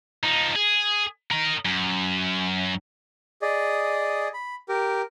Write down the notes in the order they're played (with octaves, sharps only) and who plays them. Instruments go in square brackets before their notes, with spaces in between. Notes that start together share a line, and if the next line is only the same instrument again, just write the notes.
[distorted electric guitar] F3 D#4
G#4
A#4 D#5
F#2
[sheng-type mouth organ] G#4 D5 D#5
B5
G4 A#4